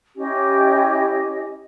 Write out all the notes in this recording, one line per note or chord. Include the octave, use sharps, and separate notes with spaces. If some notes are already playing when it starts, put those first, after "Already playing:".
C#4 E4 G4 D#5